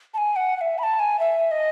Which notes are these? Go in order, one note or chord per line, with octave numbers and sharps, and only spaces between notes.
A5
G#5
F#5
F#5
E5
B5
A5
G#5
E5
D#5